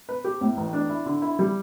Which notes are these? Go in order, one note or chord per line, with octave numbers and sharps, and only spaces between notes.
B4
G4
A2
A1
D4
E4
D3
E4
G3